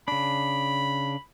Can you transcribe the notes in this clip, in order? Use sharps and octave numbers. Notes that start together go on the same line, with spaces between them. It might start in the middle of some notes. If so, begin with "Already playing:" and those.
C#3 D4 B5